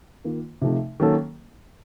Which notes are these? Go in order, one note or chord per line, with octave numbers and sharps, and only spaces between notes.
D#3 A#3 F4
C3 F3 A3 D#4
D#3 F#3 A#3 C#4 A4